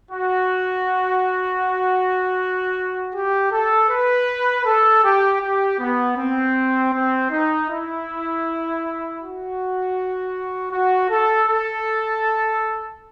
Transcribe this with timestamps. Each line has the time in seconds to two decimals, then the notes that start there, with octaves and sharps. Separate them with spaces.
0.11 F#4
3.14 G4
3.52 A4
3.90 B4
4.65 A4
5.04 G4
5.41 G4
5.79 B3
6.17 C4
6.93 C4
7.31 D#4
7.68 E4
9.20 F#4
10.72 F#4
11.10 A4
11.48 A4